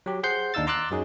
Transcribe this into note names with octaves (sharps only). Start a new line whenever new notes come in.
F#3 G4
G#4 C5 F#5 C6 G6 C7
D#2 D4 D#4 F5 E6 A6
A#5 C6 D6 E6 F#6 A6
F#2 F#3 D#4 G#4